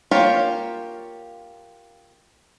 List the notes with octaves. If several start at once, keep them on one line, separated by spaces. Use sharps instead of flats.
A#3 F4 G4 C#5